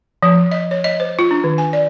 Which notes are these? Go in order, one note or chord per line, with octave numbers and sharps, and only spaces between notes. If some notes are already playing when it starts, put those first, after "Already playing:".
F3
D#5
C#5
D#5
C5
F4
D4
D#3
G#5
D5